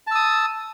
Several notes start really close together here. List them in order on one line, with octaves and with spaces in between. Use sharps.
A5 E6 D#6